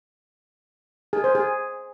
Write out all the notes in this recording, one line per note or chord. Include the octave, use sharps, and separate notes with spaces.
G#4
C5
G#4